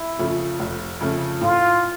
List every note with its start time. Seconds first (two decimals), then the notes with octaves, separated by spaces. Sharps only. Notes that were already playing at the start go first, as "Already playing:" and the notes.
Already playing: E4
0.19 F2 C#3 F3 A3
0.60 F1
1.01 F2 C#3 F3 A3
1.41 A2 F4